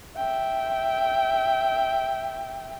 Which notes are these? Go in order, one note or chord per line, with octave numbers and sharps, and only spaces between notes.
E5 G5